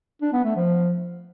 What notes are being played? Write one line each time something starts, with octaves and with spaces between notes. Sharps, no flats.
D4
B3
A3
F3